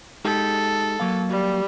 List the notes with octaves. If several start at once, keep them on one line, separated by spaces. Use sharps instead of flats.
G#3 D#4 G4 A4
F#3 A#3 F5
G3